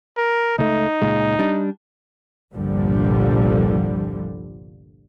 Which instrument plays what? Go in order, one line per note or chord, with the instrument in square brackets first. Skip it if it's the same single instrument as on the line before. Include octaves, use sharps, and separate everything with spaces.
[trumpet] A#4
[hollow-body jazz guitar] C#2 A3 [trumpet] D#4
[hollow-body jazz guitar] C#2 A#2 G#3
G3 D4
[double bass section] G1 C2 A#2 D3 F3 G3